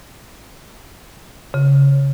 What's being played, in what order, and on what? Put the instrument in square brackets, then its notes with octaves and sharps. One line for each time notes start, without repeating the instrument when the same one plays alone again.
[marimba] C#3